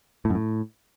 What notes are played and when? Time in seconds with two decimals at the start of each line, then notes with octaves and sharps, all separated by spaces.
0.25 A2
0.30 F#2
0.35 A2